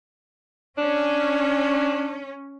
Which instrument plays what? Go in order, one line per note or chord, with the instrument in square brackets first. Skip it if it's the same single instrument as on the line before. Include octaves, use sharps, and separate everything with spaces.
[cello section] C#4 [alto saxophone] D4